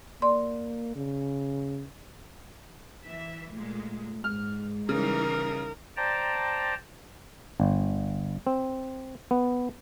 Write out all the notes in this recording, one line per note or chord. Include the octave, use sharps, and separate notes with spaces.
A#3 D5 C6
C#3
E3 E5
A#2 G#3 A3
G#2 G#3 F6
C#3 E3 G3 D#4 A#4
C5 D5 G5 A5 A#5
G1
C4
B3